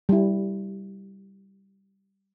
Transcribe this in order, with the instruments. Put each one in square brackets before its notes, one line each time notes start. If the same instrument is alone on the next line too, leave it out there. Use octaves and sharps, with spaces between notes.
[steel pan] G3 E4